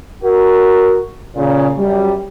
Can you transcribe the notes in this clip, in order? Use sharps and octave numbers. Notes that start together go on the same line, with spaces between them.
F#4 A#4
A#2 C#3
F#2 G3